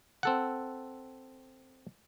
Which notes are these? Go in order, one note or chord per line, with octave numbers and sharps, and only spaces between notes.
C4 A4 F#5